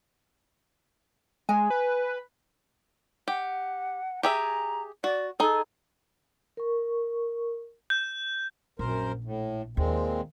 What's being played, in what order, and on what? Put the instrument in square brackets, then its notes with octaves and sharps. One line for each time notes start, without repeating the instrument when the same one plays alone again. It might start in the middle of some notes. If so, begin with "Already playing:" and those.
[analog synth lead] G#3 [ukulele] G#5
[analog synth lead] B4
[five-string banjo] G4 [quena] F#5
[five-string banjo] G4 G#4 E5 [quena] A#5
[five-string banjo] F#4 [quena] D5
[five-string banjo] D#4 G#4 [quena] A4
[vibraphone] A#4 C#6
[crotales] G6
[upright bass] A#1 [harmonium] F#2 A#4 C5
[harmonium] A2
[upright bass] D#2 [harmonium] A#2 G#3 C4